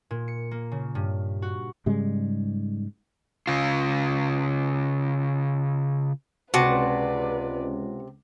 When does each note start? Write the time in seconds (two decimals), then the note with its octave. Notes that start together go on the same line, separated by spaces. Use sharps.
0.11 A#2
0.28 C#7
0.51 A#3
0.72 C#3
0.95 G2
1.42 F#4
1.86 G#2 C#3 G3 G#3
3.47 C#3 F4
6.54 C#2 C3 F#4 B4 D5 A5